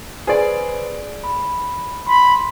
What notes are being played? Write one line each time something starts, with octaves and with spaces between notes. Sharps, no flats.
G#4 B4 C5 D5
B5
B5 C6